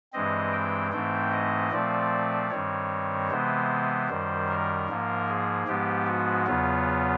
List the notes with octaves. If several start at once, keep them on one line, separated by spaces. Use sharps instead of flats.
G2 E3 G#3 C4 D#5
G5
G#2 E3 A3 C4 G5
D#5
A#2 F3 A3 C4 D5
G2 D#3 G3 C4 C#5
C3 E3 G#3 B3 C5
F#2 D#3 G3
A#4
G#2 F3 A#3
G#4
G#2 F3 G#3 B3 G4
F#4
E2 C#3 F#3 B3 F4